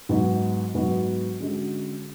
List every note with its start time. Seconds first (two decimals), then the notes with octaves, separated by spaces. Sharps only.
0.09 G#2 F#3 B3 F#4
0.74 G#2 F#3 B3 F#4
1.40 D3 G#3 C#4 F#4